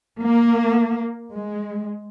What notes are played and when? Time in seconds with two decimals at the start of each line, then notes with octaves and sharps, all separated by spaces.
0.19 A#3
1.33 G#3